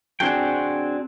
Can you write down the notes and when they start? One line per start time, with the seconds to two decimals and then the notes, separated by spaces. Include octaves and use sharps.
0.20 C4 D4 F#4 G#4 G5